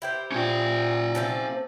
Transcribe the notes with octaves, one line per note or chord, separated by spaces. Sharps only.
E4 G4 C5
A#2 C#4 G5
C3 F3 A4